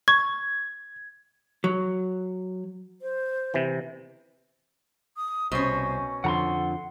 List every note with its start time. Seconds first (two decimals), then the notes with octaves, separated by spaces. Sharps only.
0.08 C#6 G#6
1.64 F#3
3.02 C5
3.54 C3 E3
5.17 D#6
5.52 C2 B2 C#4 C5
6.24 F2 D3 F3 A4 F#5 A#5 C6